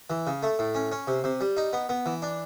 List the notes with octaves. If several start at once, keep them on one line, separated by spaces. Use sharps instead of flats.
E3
C#3
A3
A2
C#4
C#4
C3
C3
G3
D#4
B3
B3
E3
D4